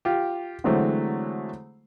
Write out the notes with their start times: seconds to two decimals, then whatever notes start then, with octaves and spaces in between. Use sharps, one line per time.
0.05 F4 G4
0.64 D3 E3 F#3 G#3 A3 C4